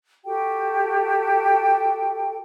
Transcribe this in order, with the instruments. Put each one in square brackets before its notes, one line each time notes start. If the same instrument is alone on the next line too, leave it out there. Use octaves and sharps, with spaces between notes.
[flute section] F#4 G4 A4 G5